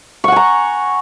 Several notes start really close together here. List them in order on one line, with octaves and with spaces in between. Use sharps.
C#6 F#5 G#5 A#5